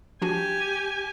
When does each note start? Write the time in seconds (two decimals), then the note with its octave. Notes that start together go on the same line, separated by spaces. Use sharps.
0.22 F3 D4 F#4 G4 G#5